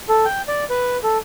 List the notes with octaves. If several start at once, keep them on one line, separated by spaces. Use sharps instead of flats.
A4
G5
D5
B4
A4